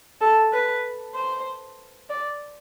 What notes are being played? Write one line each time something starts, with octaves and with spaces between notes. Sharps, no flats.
A4
B4
C5
D5